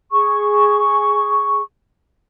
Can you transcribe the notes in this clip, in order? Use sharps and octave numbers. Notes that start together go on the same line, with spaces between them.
G#4 C#6